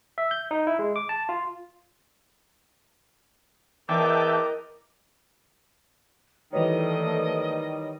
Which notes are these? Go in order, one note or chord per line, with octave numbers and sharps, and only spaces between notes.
E5
G6
D#4
E4
G#3
D6
A5
F4
E2 A#4 D#5 E5 G5 A5 D6
D#3 E3 G3 A3 B4 C#5 D#5